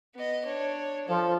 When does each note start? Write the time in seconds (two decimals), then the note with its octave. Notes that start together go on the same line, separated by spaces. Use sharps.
0.15 B3 D#5
0.45 D4 C#5
1.08 F3 A4